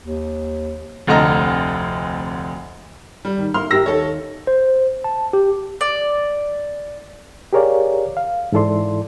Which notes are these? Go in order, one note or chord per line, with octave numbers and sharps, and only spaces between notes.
D#2
F1 D2 D3 D#5 A#5
G3
D#3
A#3 E4 C6 F6
E4 G4 A#4 E6 A#6
D#2 A4 C#5
C5
A5
G4
D5
G4 G#4 A#4 C#5 D5 F5
F5
G#2 E3 E4 A4 D5 C6